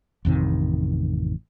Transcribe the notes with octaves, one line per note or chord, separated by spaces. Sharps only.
A1 F2 C3 D#3